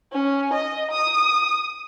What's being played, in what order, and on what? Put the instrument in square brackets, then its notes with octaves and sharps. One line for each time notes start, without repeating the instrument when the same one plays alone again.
[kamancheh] C#4
D#5
D#6